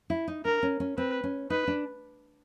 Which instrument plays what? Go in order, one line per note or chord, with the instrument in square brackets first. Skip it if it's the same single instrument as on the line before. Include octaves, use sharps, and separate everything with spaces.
[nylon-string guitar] E4
D#4
[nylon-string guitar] D4 [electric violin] A#4
[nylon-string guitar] C#4
C#4
[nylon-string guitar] C4 [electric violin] B4
[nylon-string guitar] C#4
[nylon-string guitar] D#4 [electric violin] B4
[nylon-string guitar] D4